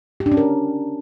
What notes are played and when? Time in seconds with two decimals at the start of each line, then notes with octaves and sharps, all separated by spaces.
0.20 G4
0.26 D4
0.32 C#4
0.37 A#4